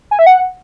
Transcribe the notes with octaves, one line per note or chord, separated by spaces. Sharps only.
G#5
E5
F#5